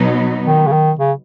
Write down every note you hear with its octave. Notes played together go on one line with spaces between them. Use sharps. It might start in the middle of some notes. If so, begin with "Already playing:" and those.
Already playing: B2 F#3 B3 D#4
D#3
C#3
D#3
C#3